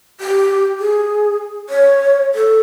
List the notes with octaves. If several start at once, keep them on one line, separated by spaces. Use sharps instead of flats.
G4
G#4
C#5
A4